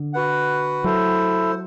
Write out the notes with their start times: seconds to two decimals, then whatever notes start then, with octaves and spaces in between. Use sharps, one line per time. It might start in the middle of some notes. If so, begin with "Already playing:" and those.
Already playing: D3
0.13 F#4 B4 F#5
0.84 F#3 E4 A4 C5